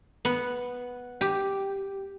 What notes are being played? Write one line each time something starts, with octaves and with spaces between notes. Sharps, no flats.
B3
G4